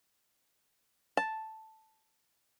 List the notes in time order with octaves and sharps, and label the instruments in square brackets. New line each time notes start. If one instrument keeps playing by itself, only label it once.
[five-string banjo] A5